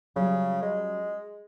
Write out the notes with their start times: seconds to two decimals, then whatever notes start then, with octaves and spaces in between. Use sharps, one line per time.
0.16 C#3 F#3 G3 C#4
0.62 G#3